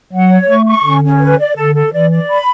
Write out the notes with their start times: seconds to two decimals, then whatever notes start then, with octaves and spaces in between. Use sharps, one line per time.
0.12 F#3 F#5
0.29 C#5
0.47 A3 C#6
0.66 C#6
0.84 D3 C#4
1.02 C#4
1.20 B4
1.39 D5
1.57 D3 A4
1.74 A4
1.93 E3 D5
2.11 D5
2.30 B5